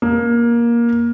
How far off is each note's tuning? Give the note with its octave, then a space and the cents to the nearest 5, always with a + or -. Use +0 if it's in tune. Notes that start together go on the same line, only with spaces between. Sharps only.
A#3 +15